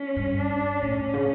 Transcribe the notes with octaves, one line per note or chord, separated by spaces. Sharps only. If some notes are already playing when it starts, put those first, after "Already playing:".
Already playing: C#4
G2
D4
A2 C#4
C#3